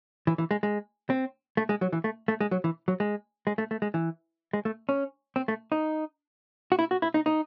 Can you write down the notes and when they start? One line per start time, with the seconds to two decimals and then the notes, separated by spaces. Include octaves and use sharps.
0.27 E3
0.38 E3
0.51 G#3
0.63 G#3
1.10 C4
1.57 A3
1.69 G#3
1.81 F#3
1.93 E3
2.04 A3
2.28 A3
2.40 G#3
2.51 F#3
2.64 E3
2.88 F#3
3.00 G#3
3.47 G#3
3.58 A3
3.71 A3
3.82 G#3
3.94 E3
4.53 G#3
4.65 A3
4.89 C#4
5.36 C4
5.48 A3
5.72 D#4
6.72 F#4
6.79 E4
6.91 F#4
7.02 E4
7.14 D#4
7.26 D#4